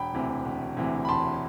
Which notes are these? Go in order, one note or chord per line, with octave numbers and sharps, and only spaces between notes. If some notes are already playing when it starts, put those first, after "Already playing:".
Already playing: E1 G5 B5
D2 C3 E3
E1
D2 C3 E3
B5
E1 A5 C6